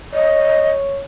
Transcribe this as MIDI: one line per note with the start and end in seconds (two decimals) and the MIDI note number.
0.14 1.04 73
0.14 0.70 75